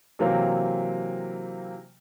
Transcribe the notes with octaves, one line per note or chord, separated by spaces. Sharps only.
C3 E3 F#3 A#3 C4